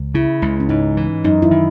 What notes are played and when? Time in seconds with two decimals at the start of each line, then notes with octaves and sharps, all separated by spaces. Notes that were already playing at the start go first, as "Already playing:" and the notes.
Already playing: C#2
0.14 C#3 E4
0.42 C#2
0.60 C#4
0.69 G#2 D#4
0.97 E3
1.24 F#2 D#4
1.42 E4
1.51 D#3